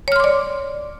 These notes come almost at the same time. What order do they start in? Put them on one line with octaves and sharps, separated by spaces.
C#5 F6 C6 D6 D5